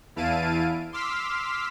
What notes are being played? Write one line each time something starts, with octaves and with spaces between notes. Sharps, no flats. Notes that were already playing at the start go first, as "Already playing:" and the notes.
E2 E4 F5 A5 D7 D#7
C6 D6 E6 F6 B6